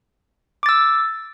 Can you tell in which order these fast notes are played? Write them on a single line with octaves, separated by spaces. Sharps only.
D6 A6 E6